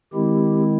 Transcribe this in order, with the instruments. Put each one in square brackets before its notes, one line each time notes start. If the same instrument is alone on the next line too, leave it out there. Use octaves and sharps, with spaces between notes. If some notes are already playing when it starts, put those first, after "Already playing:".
[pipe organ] D#3 G#3 C4 E4 G4